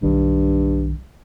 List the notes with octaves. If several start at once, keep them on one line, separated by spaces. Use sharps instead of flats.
B1 G2 D#3